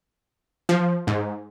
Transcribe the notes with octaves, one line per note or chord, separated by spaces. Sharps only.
F3
G#2